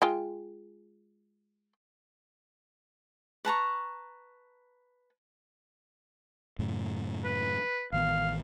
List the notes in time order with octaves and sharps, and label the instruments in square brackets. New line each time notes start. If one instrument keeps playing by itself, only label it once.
[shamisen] G#3 F4 G5
[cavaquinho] B4 A5 A#5 C#6
[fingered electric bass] F#2 A2 C#3
[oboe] B4
[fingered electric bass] A1 D#3 B3 [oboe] F5